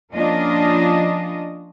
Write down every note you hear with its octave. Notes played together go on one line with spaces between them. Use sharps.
F3 A#3 C#4 D4 F4 D#5